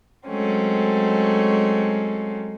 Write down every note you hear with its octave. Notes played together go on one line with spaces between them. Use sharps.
F#3 G#3 A3 C4 C#4